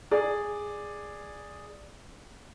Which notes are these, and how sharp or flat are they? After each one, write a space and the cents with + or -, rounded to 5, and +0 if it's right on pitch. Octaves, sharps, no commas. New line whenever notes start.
G#4 -5 D5 +5